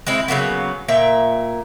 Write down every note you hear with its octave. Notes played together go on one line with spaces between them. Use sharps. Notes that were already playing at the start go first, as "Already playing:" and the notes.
G#3 C4 E4
C#3 F#3 A#3 B3
A#2 A#3 E5 G5